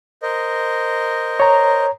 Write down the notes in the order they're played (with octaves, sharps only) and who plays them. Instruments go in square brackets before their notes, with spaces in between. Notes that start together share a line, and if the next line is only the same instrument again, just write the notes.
[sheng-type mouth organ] A#4 C5 D#5
[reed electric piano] C#5 A#5